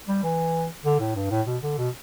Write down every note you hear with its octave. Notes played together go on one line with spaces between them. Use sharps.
G3
E3
D3
A2
G2
A2
B2
D3
B2